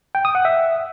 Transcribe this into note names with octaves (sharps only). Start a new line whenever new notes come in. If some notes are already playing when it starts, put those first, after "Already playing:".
G5
D#6
F#5
E5